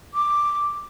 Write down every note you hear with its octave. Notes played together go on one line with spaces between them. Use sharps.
D6